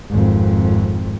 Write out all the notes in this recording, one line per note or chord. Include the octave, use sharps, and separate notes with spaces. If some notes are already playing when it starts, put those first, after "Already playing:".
G#1 F2